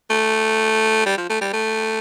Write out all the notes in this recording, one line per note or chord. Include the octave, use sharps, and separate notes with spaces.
A3
G3
F3
A3
G3
A3